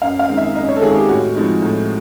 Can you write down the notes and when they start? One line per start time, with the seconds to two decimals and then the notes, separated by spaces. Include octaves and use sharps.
0.02 F#2 F5
0.19 F5
0.29 D#3 G#3 C4
0.37 E5
0.55 F#2 D#5
0.69 C#5
0.76 A4
0.82 D#3 G#3 C4 G#4
0.95 G4
1.09 A2 F#4
1.35 F3 G#3 C4 D#4
1.62 A2